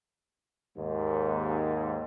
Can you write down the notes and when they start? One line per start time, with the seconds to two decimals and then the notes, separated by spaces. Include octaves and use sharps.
0.76 D#2 G#2